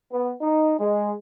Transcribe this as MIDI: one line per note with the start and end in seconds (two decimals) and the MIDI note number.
0.12 0.33 59
0.42 0.74 63
0.79 1.12 56